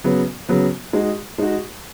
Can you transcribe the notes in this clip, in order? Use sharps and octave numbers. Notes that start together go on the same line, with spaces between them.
C#3 F#3 B3
C#3 F#3 B3
G#3 D#4 F#4
G#3 D#4 F#4